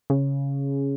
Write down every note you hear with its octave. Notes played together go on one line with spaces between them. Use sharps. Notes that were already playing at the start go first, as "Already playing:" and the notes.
C#3